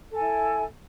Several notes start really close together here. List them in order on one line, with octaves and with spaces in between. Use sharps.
A4 G#5 E4